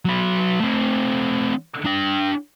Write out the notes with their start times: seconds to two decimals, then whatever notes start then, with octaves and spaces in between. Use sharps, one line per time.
0.05 F#3 B4
0.61 A3 C4
1.85 D4 G5